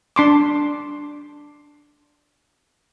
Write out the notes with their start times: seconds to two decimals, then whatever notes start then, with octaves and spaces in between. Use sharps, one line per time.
0.16 D4 C6 D6